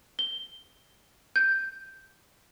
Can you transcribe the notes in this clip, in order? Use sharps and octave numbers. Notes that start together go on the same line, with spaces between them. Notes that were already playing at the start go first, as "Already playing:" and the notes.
G7
G6